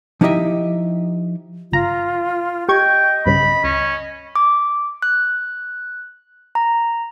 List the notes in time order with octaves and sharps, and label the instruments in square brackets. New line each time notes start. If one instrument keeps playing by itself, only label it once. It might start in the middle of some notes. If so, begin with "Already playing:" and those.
[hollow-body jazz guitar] F3 D#4 E4 G4 D#5 E5
[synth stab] G1 A#5 [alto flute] F4
[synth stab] G4 C#6 G#6 [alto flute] D#5 [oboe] G5
[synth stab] B1 G2 C#3 [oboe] B5
[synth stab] C#2 [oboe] C#4
[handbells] D6
F#6
A#5